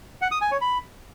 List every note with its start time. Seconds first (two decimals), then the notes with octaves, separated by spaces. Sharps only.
0.22 F#5
0.31 D#6
0.41 G#5
0.51 C#5
0.61 B5